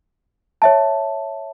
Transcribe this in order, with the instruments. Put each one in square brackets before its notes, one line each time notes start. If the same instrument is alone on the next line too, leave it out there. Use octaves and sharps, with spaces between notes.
[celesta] C#5 E5 A5